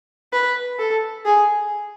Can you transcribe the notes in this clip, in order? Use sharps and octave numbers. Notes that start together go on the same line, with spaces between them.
B4
A4
G#4